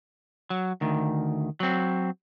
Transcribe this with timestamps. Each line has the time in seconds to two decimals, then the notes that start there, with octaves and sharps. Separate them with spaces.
0.50 F#3
0.81 D2 D#3
1.60 F#3 C4